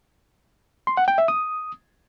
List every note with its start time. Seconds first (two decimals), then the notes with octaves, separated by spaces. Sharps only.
0.87 C6
0.97 F#5
1.08 G5
1.18 E5
1.28 D#6